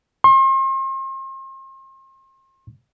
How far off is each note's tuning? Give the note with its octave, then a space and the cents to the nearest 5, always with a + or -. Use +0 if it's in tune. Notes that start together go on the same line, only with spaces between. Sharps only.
C6 +40